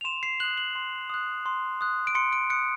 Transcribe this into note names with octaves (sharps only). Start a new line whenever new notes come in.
F7
C6 E7
C7
D#6 F#6 F#7
F#7
C6
D#6 F#6
C6
D#6 F#6
D7
C6 C#7
D7
D#6 F#6 C#7